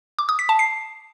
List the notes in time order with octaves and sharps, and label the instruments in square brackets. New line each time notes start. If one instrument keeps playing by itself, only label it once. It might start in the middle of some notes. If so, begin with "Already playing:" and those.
[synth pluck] D6
D#6
B6
A5
C7